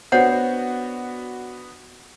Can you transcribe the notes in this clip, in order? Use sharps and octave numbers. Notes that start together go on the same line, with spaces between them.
B3 D4 F#4 C5 C#5 F#5